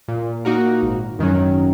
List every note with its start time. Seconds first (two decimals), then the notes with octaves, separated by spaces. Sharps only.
0.08 A#2
0.45 A#3 D#4 F#4 A#4
0.82 G#1
1.19 F#2 D#3 F#3 C#4